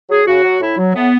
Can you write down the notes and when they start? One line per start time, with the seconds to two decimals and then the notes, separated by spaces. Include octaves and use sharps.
0.10 F#3 G#4
0.27 C#3 F#4
0.44 F#3
0.61 A2 E4
0.78 F#3
0.95 A2 B3